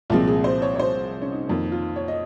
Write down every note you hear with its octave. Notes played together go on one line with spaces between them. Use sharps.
C2 A#2 F3 G#3 C4 F4
G#4
C5
C#5
C#5
C5
C#4
D#4
F2 D#3 A#3
F4
C#5
D#5